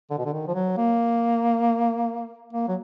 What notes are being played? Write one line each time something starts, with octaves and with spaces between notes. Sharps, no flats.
D3
B2
D3
D#3
F3
F#3
A#3
A#3
F#3